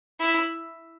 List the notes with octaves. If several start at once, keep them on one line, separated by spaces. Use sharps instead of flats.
E4